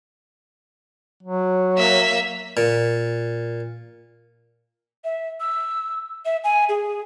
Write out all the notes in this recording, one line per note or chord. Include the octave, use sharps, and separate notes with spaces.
F#3
A#3 E5
A#2
E5
E6
E5
G#5
G#4